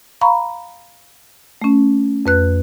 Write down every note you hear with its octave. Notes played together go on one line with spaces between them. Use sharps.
F5 A#5 B5 C#6
A3 C#4
F2 B4 F#6